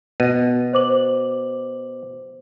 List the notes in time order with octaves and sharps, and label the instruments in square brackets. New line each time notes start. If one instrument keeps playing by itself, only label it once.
[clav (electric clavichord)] B2 [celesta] D#7
[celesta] C5 D6 F#7